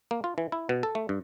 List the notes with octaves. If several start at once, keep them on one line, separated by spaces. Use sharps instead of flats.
A#3
F4
E3
E4
B2
A4
A3
G2